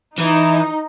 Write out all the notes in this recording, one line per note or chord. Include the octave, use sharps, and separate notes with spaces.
E3 D#4